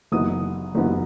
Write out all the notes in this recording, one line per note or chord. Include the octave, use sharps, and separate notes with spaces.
F#1 F#2 E3 B3 D#4 D#6
F#1 F#2 E3 B3 D#4